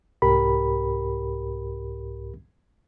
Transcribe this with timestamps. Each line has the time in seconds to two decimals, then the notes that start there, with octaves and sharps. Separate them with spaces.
0.22 C2 G#2 G4 A#4 B5